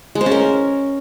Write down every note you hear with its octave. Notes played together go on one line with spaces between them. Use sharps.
G#3
C5
C#4
A#4